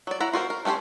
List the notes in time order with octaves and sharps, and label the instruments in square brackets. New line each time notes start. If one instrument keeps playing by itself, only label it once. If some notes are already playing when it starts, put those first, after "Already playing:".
[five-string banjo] F#3 D5
E4 F#5 A#5
F4 F#4 A#4 C5
A#4
A3 C#4 F#4 G4 C5